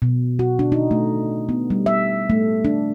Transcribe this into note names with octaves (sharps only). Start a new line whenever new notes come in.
B2
F#4
D4
D#4
A3
B3
G3
E5
A3
D4